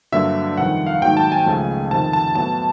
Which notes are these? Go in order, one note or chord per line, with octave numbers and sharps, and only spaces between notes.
G2 D3 F#3 A#3 E5
F2 C3 D#3 G3 F#5
F5
G#2 D#3 F#3 A#3 G5
A5
G#5
C#2 C#3 F3 A3
F2 C3 D#3 A5
A5
A2 F#3 B3 A5